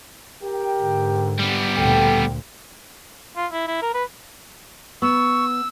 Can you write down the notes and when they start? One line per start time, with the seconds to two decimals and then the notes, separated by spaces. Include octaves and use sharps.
0.43 G4 A#4 G5
0.78 G#2 D3
1.39 G3 B3
1.77 D2 A#2 A4 G5
3.36 F4
3.52 E4
3.67 E4
3.82 A#4
3.94 B4
5.02 B3 C#6 E6